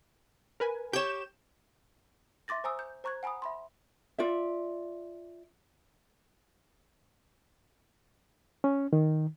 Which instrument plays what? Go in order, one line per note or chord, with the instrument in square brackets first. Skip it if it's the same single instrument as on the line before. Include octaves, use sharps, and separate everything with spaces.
[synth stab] A#4 B4 G#5
[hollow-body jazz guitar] G4 C#5 [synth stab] G6 E7
[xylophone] E5 C6 D6 A6 A#6
C5 G#5 A#5 D#6 E6
G6
C5 A#5 C#6 F#6 G#6
F#5 G#5 A#5 B5 D#6
E5 B5 C6
[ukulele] F4 D5 E5
[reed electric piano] C#4
D#3